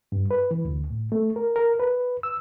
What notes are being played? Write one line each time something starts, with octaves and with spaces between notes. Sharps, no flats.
G2
B4
E3
D2
A2
A3
A#4
A#4
B4
E6